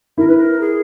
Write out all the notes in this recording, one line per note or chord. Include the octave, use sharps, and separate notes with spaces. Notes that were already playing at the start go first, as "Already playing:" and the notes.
E4 A#4
B4
A#4
G#4